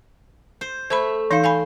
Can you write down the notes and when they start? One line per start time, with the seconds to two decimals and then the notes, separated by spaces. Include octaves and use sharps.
0.61 C5
0.90 A3 C5 E5 B5
1.31 E3 D#4 C5 F5
1.44 F5 G#5 B5 C6